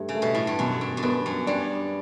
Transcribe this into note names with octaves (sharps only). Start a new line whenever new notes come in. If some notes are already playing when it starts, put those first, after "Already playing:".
Already playing: G2 A3
C#3
A3
B2
A2
G2
F#2 B2
G2
F#2
G2 B3
F#2
G2 D4